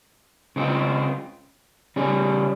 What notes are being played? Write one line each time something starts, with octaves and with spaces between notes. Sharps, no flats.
C#3 G#3 C4 F4
C#3 G3 C#4 G#4